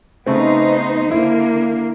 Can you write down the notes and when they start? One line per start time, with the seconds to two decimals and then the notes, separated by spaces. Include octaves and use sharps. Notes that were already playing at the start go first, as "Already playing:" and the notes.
0.26 C#3 A3 B3 C4 D#4 C5
1.11 D3 A#3 E4